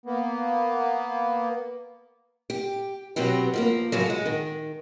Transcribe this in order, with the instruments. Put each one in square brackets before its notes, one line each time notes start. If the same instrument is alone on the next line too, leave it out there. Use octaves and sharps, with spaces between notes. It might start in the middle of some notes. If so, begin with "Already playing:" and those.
[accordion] A#3 B3
[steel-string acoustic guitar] G4
B2 F#3 B3 C4 G4
F3 G3 A#3
A2 C#3 F3 F#3
G#3 F#4
D#3